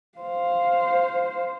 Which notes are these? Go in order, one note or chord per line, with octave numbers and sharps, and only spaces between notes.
C5 F5